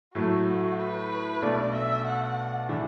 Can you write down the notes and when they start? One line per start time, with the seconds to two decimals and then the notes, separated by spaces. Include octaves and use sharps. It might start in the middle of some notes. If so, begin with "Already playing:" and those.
0.15 A2 F#3 A3 F#4
0.79 B4
1.42 B1 B2 A3 D4 D5
1.74 E5
2.06 F#5
2.69 A2 E3 D4